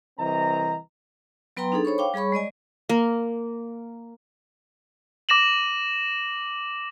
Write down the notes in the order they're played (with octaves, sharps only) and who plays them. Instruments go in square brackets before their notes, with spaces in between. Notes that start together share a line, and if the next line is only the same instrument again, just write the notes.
[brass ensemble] C2 E3 C4 D#5 A#5
[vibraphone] F#3 B3 B4 G5 A#5 C6
D4 D#4 G#4 A4
C5 C#5 B5 C#6
F5 G5 D6
G3 G#4 C#5 B5 C#6
G#3 D5 D#5 G#5
[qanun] A#3
[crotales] D6 A#6 E7 F#7